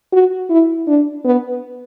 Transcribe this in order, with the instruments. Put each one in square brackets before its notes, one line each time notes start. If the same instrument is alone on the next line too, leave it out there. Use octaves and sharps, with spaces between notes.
[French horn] F#4
E4
D4
B3